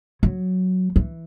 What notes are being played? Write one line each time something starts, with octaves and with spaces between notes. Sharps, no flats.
F#3
E3